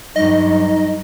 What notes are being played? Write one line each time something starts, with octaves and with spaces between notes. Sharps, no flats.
G2 F#3 D#4 D#5